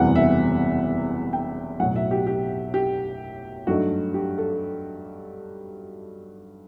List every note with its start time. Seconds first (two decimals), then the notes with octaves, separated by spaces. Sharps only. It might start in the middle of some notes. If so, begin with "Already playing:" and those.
Already playing: F#1 E2 C3 E3 G3 F#5
0.15 E5
1.33 G5
1.80 B1 A2 F#3 F#5
1.96 E5
2.11 G4
2.27 G4
2.74 G4
3.67 G2 F#3 A3 D#4 F#4
4.14 G4
4.38 A4